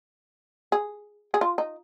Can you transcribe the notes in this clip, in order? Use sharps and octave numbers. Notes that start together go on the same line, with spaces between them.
G#4
G#4
F4
D#4